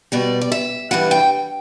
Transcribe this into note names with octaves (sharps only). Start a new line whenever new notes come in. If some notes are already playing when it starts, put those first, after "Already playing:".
B2 G3 D5
D5
E5
G2 E3 G3 F#5
G5